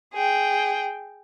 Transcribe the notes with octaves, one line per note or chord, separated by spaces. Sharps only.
G#4 G5